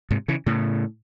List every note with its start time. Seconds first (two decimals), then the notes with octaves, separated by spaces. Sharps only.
0.11 G#2 C3
0.28 C#3 E3
0.46 A2 C#3